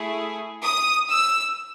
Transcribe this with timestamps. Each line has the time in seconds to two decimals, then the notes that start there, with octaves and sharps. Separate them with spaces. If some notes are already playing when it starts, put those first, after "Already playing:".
Already playing: A3 E4 G#4
0.63 D#6
1.09 E6